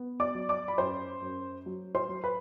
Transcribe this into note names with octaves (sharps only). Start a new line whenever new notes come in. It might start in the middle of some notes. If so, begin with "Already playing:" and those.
Already playing: B3
D5 D6
F#3
D5 D6
B5
F#2 C5 C6
F#2
F#3
C5 C6
F#3
B4 B5